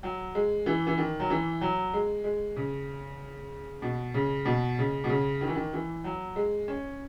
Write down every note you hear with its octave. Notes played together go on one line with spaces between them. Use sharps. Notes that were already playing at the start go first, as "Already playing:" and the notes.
F#3
G#3
E3
E3
D#3
F#3
E3
F#3
G#3
G#3
C#3
B2
C#3
B2
C#3
B2
C#3
D#3
E3
D#3
E3
F#3
G#3
C#4